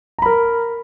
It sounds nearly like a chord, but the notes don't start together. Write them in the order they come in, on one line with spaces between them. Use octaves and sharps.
A#5 B5 A#4